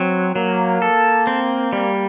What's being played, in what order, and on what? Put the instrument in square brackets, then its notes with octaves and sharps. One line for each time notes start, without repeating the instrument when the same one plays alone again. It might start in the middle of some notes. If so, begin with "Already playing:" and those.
Already playing: [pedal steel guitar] F#3 [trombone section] C4
[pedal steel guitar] F#3 [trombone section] A#3
[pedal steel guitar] A4
C4
G3